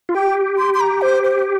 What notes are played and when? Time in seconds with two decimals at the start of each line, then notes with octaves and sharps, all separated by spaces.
0.09 F4
0.15 G4 G5
0.58 C6
0.74 C6
0.81 A#5
1.02 C5
1.23 C5